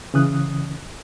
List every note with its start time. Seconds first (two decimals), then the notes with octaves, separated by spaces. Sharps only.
0.14 C#3 E3 C#4 D#6 F#6